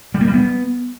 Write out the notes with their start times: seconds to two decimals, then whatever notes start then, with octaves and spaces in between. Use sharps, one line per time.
0.14 G3
0.21 A#3
0.27 G3
0.34 B3